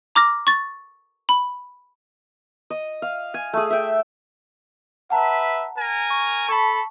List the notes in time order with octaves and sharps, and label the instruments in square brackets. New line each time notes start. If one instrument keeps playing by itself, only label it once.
[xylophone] A#5 D6 F6 A#6
C#6 A6
B5
[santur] D#5
F5
G#5
A3 G#4
E5 G5
[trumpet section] B4 E5 [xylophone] F#5 A5 A#5
[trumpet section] A#4 G#5
[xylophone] C#6
[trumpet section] A4 B5 [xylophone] A5 C#6